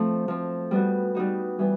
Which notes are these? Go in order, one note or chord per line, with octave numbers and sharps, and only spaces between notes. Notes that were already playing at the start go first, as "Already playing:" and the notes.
Already playing: F3 A3 C4
F3 A3 C4
G3 B3 D#4 F#4
G3 B3 D#4 F#4
E3 G3 B3